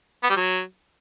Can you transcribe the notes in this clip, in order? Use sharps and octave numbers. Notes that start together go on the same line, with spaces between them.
B3
G3
F#3